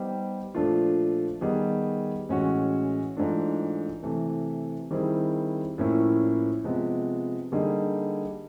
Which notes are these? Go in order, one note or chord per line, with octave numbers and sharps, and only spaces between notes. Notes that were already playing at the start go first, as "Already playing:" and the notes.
Already playing: G3 B3 D#4 G4 C5
A#2 F3 A3 D4 F4
D#3 G3 B3 D#4 G#4
A2 E3 G#3 C#4 F#4
G#2 E3 A3 D4 F4
C3 E3 A3
D#3 G3 C4 E4 G#4
A2 F3 A#3 C#4 E4
C3 F3 G#3 B3
D3 G3 A#3 D#4 G#4